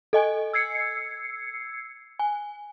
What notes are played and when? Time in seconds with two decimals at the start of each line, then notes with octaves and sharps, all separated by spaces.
0.13 A4 D#5 G#5
0.53 E6 G#6 C7 C#7
2.19 G#5